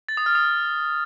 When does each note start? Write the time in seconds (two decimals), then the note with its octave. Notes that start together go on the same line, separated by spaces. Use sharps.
0.09 A6
0.17 D#6
0.26 F6
0.35 D#6